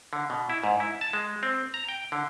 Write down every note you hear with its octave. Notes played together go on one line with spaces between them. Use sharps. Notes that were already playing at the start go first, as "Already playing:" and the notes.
D3
B2
E4
G#2
E4
A5
G#3
C4
A#5
G5
D3